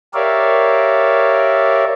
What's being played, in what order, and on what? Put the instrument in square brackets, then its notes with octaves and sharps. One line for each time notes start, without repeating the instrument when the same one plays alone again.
[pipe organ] G4 A#4 C#5 D5 E5 F5